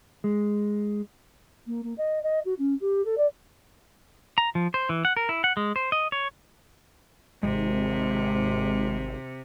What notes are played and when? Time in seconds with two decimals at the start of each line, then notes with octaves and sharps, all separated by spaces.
0.24 G#3
1.66 A#3
1.83 A#3
1.98 D#5
2.23 D#5
2.45 F#4
2.58 C#4
2.80 G4
3.04 A4
3.17 D5
4.38 A#5
4.55 F3
4.74 C5
4.89 E3
5.05 F#5
5.17 A#4
5.29 E4
5.44 F#5
5.57 G#3
5.76 C5
5.92 D#5
6.12 C#5
7.43 G#1 C3 G#3